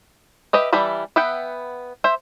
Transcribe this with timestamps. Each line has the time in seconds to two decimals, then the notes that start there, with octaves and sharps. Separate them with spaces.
0.53 G4 B4 D#5 E5
0.73 E3 G3 E5 A5 B5
1.16 B3 B4 E5 F#5 G5
2.04 C5 E5